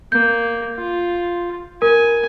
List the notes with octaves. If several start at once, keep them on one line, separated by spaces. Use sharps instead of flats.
A#3 G6
F4
A#4 G#5